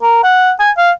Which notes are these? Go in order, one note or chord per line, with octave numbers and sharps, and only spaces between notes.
A#4
F#5
G#5
F5